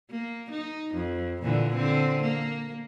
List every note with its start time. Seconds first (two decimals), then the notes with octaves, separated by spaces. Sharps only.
0.11 A#3
0.51 D#4
0.95 F2
1.43 A#2 D3 E3
1.74 D3 C4
2.21 A#3